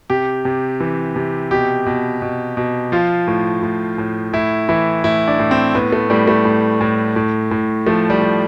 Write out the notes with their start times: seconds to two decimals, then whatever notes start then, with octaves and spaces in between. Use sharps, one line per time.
0.10 C3 G4
0.45 C3
0.80 E3
1.16 C3
1.51 B2 G4
1.86 B2
2.22 B2
2.57 B2
2.92 F3 F4
3.28 A2
3.63 A2
3.98 A2
4.33 A2 E4
4.69 E3 E4
5.04 A2 E4
5.28 D4
5.39 A2
5.51 C4
5.75 A2 B3
5.92 A3
6.10 A2 G3
6.27 A3
6.45 A2
6.81 A2
7.16 A2
7.51 A2
7.86 F3 A3
8.10 G3
8.22 F3